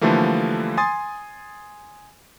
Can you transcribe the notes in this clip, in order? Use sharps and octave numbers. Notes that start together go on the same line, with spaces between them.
D3 E3 F3 G3 A3 A#3
G#5 C6 D#6 A6